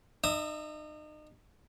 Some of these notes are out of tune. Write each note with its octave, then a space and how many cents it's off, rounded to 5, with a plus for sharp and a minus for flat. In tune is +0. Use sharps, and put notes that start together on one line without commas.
D#4 -35 E5 +0 D#6 -10